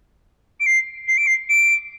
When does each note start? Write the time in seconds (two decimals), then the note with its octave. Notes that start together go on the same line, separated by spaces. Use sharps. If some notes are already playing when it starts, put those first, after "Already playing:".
0.60 D7
0.66 C7
1.08 C7
1.18 D7
1.27 C7
1.49 D7